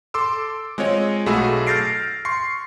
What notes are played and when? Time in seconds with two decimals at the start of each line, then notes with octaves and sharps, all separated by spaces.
0.14 A4 C6 D6 E6
0.78 G#3 C4 F4 C#5 D#5
1.26 B1 A3 F#4 G#4 B5 E6
1.66 F6 G6 A6 A#6 C7 D7
2.25 C6 C#6 C7